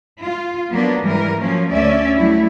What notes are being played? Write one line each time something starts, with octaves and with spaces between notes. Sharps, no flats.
F4
F#3 A#3 B3 D4
G#2 E3 G3 A#4
F3 F#3 A#3 C#4
D2 C#4 D5 E5
F#3 G3 A3 E4